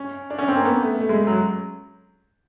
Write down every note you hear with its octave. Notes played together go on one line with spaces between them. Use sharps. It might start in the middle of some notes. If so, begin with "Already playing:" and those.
Already playing: C#4
D4
C#4
C4
A#3
B3
A3
A3
G#3
F#3